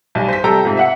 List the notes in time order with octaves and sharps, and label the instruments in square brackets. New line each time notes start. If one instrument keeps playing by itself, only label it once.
[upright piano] B1 G3 G#5
C5 B6
C3 G3 A4 G5 A#5 E6
G#2 C3 F4
E5 F#5 C#7